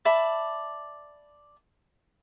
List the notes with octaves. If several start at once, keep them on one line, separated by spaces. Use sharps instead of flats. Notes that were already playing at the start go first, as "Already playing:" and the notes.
D5 E5 A5 B5